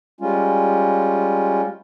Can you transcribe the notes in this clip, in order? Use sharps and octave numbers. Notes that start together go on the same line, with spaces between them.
G3 G#3 C#4 F4